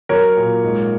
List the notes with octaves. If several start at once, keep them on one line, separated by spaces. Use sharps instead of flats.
F#3 A#4 C#5
A#2
G#2